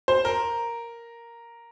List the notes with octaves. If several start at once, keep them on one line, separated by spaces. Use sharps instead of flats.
C5
A#4